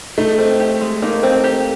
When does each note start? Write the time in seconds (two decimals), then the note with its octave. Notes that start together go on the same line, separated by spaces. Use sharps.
0.18 A3 D#4
0.38 C4
0.60 G4
0.81 G#3
1.02 A#3 D#4
1.23 C4
1.44 G4